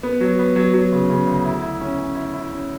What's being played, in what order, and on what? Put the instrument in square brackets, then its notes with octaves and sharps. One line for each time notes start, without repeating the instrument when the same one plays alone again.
[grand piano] B3
F#3
B3
F#3
F#3
C#3
C#3
D2
E4
E4
C#4
C#4
E4
E4
C#4